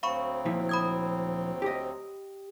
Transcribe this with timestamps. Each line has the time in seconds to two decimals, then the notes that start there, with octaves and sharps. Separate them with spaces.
0.03 D2 F#3 C4 F5 B5 C#6
0.45 A#2 F3 E4
0.69 B5 D#6 G#6
1.62 G4 D#5